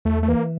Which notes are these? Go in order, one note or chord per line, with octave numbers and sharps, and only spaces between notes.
E2 A3
A3
E3 A#3